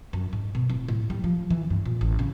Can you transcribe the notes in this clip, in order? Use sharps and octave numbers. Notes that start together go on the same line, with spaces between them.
F#2
G#2
B2
D1
A2
G3
F3
E3
G2
A#2
A1
C#3